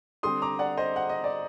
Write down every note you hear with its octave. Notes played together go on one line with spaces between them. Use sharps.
D3 G3 C4 C6 D#6
A#5 D6
D5 F#5
C5 D#5
F#5
D#5
D5